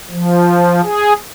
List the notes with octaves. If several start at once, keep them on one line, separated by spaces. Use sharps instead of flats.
F3
G#4